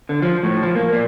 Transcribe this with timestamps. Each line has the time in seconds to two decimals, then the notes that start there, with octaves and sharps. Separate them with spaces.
0.09 D3
0.22 F3
0.43 A2
0.63 F3
0.75 A#3
0.93 A#2